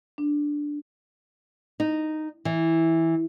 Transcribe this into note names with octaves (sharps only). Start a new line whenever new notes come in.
D4
D#4
E3